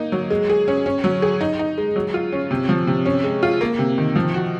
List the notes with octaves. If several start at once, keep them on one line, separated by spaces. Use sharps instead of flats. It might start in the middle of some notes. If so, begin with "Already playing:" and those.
Already playing: A#3 D#4
F#3
G#3
G#4
C#4
C#4
F#3
G#4
D#4
D#4
G#3
F#3
F4
C#4
C3
F3
C3
C#4
G#3
F4
A#3
C3
D#3
F3
F#4